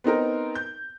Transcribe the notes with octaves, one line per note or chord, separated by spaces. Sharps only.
B3 C4 D#4 A#4
G6